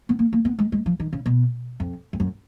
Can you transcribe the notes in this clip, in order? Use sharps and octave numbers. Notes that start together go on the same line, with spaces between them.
B3
A#3
A#3
B3
G#3
G#3
F3
D#3
C#3
B2
F2
F2
F#2